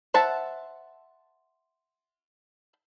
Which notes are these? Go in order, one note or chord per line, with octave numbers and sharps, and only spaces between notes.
C5 E5 F#5 A5